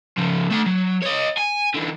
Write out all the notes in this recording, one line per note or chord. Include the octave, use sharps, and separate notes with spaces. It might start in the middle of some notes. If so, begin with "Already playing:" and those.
C#3 F3
A3 F#5
F#3
C#5 D#5
G#5
D3 E3